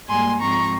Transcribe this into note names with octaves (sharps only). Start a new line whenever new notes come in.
G#2 G3 A#3 G#5 C6
G#2 F3 C4 A#5 C#6